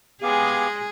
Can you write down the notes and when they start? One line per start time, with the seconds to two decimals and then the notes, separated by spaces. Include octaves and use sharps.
0.23 G#3 B3 G4 G#4 F5 G#5